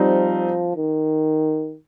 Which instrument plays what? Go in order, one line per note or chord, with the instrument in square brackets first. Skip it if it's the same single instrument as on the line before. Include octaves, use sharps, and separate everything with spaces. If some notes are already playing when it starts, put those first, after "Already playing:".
Already playing: [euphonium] F3 [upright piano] G3 C4 D#4
[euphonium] D#3